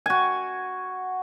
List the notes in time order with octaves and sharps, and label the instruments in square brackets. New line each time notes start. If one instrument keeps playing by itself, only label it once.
[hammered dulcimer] F#4 G#5